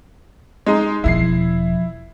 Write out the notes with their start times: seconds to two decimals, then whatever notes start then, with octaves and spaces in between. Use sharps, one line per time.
0.66 G#3 D#4
1.04 E1 F3 E4 C7